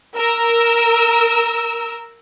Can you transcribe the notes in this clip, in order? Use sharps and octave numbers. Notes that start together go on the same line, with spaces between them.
A#4 E6